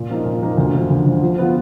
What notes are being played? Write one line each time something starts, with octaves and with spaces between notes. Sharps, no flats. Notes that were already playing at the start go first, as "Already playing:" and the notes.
Already playing: A#2
F3 A#3 D#4
A#2
F3 A#3 D#4
D2
D3 F3
D2
D3 F3
F3
B3 F4